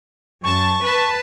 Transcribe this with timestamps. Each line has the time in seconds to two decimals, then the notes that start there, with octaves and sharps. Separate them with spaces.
0.44 F#2 A5 C#6
0.84 B4 A5